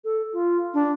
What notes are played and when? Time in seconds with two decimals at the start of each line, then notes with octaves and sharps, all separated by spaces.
0.04 A4
0.33 F4
0.74 D4